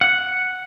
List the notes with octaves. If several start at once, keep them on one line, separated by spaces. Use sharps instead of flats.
F#5